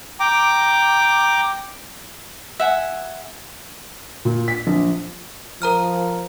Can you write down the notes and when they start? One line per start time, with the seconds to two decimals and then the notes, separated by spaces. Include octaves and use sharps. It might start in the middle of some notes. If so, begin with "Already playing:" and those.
0.20 G5 A#5 D6
2.60 E5 F#5 G#5
4.25 A#2
4.48 B6
4.67 A#1
5.62 F3 A#4 A#5 F6